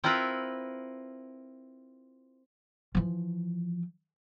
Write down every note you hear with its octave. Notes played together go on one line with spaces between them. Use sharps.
C4 E4 F4 A#4 B4
E3 F3